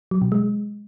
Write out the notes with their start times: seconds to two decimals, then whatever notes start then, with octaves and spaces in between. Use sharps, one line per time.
0.11 F#3
0.22 B2
0.32 G#3